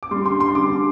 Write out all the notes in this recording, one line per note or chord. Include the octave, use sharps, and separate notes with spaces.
D6
G3 C6
D3 C6
D3 C6
G3 D6
D3